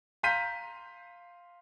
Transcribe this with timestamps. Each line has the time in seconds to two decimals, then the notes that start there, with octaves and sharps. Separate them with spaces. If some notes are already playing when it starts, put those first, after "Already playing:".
0.23 F5 A#5 C6 G6 B6 D#7